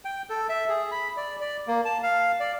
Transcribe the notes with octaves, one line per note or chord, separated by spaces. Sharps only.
G5
A4
E5
G#4
B5
D5
D5
A#3
A5
F5
D5